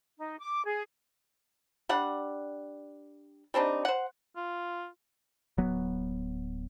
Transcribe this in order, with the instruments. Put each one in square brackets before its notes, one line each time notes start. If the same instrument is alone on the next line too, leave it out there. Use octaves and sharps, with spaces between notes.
[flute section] D#4
D6
G#4
[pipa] G3 D4 F#5
G3 C4 D4 D#4
C5 F#5
[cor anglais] F4
[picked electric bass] D1 F#3 B3